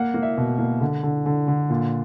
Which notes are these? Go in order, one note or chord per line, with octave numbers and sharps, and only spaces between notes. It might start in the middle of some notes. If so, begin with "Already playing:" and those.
Already playing: A#3 F#5
A#3
E5
B2
A#3
D3
D3
D3
D3
A#2